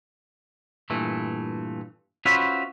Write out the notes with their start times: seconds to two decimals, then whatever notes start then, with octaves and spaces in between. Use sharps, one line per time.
0.90 G2 A#2 E3 A3
2.25 C#4 F4 F#4 B4 C5 E5